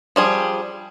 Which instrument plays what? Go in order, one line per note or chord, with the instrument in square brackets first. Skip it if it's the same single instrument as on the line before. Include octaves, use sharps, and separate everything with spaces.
[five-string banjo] F3 G3 G#4